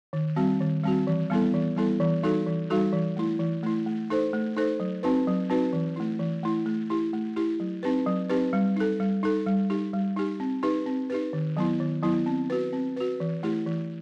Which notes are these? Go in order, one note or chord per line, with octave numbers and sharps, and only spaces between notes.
D#3
G3 C4 F#4
D#3
G3 C4 F#4
E3
G3 B3 E4 A4
E3
G3 B3 E4 A4
E3
G3 D#4 F#4 A4
E3
G3 D#4 F#4 A4
E3
A3 E4
E3
A3 E4
A3
D#4 A4 C5
A3
D#4 A4 C5
F#3
C4 D#4 F#4 B4
F#3
C4 D#4 F#4 B4
E3
A3 E4
E3
A3 E4
A3
E4 G4
A3
E4 G4
F#3
C4 D#4 G4 B4
F#3
C4 D#4 G4 B4
G3
D#4 A4
G3
D#4 A4
G3
D#4 G4
G3
D#4 G4
C4
D#4 G4 B4
C4
D#4 G4 B4
D#3
F#3 B3 E4
D#3
F#3 B3 E4
C4
F#4 B4
C4
F#4 B4
E3
A3 E4 G4
E3